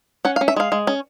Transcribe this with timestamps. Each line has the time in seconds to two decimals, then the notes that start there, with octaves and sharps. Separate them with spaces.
0.25 C#4 F#5
0.36 F5
0.41 C#4
0.48 E5
0.56 G#3 F5
0.72 G#3
0.87 C#4